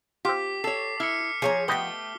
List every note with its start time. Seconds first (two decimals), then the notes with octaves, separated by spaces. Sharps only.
0.25 C4 F4 G4 D6 B6
0.64 A4 C#5 C7
1.00 E4 F6 C#7
1.42 F3 G#4 C#5 A#5
1.68 A3 B3 G4 D#5 G5 G7